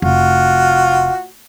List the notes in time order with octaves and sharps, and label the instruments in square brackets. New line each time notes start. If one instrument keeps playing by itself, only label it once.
[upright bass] F1 [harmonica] F4 F#4